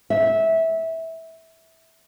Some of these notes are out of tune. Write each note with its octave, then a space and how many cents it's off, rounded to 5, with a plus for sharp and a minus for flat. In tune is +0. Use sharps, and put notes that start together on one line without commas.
E5 -15